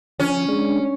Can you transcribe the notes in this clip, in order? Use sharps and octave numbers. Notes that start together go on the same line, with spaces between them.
F3 C#4
G#3 D4